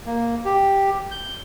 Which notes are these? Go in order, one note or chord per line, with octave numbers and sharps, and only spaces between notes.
A#3
G4
G6